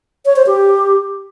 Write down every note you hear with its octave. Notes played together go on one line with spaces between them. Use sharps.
C#5
C5
G4